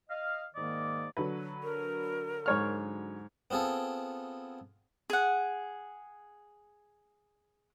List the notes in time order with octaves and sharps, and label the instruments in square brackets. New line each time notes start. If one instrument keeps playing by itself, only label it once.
[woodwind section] D#5 F5
G#2 D#3 A#3 D5 D#5
[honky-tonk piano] D3 F#3 B4
[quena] A#4
[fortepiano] G#2 C#5 F6
[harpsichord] B3 C4 F4 G#4 A4
[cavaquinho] G#4 F#5